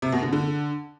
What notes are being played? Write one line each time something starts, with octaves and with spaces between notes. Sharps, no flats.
C3
B2
D3
D3